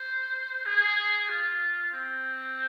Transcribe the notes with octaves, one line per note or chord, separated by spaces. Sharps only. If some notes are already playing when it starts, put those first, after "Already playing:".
Already playing: C5
G#4
F4
C4